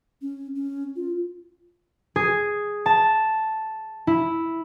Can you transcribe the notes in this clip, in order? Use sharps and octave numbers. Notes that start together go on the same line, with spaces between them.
C#4
C#4
F4
G#4
A5
E4